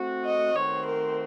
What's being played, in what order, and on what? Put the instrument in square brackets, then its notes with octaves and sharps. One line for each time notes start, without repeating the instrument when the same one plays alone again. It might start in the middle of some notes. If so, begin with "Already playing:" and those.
Already playing: [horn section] A3 C4 F#4
[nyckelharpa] D#5
[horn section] D#3 A3 C4 F#4 C5 [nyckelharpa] C#5
[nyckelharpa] A#4